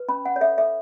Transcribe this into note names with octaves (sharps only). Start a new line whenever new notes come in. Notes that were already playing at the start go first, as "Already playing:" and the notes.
Already playing: B4
C#4 B5
C#4 F#5
C#5
A4 E5
A4 E5